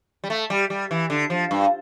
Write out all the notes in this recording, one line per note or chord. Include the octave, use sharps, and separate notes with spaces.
G3
A3
G3
G3
E3
D3
F3
G2